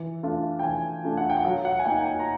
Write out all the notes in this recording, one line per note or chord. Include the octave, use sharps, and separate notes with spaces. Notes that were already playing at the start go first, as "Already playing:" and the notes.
Already playing: E3
A3 D4 F4
G5
E3 G#5
A3 D4 F4
F#5
G5
F#5
F#3 F5
F#5
G#5
A#3 D#4 G5
G5
G#5
A#5